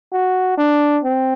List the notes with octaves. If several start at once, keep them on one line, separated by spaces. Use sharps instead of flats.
F#4
D4
C4